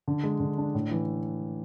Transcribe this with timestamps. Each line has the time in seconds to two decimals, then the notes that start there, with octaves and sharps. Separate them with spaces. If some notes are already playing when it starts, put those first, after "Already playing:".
0.08 D3
0.24 G#3
0.40 D3
0.58 D4
0.74 A2
0.91 E3